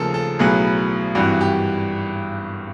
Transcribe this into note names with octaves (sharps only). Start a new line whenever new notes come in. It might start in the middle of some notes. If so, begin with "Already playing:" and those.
Already playing: D#2 C#3 F3 A3 A4 A#4
A4
B1 A2 F#3 B3 G#4
G#1 G2 E3 G3 F#4
G4